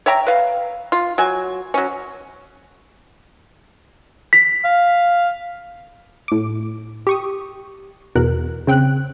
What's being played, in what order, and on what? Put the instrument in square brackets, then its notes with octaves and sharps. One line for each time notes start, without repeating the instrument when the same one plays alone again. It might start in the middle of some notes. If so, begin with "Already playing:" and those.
[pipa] C#5 E5 G5 A#5
B4 F5
F4
F#3 G#5
F#3 C#4
[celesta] B6
[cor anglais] F5
[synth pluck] A2 D6
G4 C#6 D#6
E2 B2 A#4 F#6
C#3 C4 G5 F#6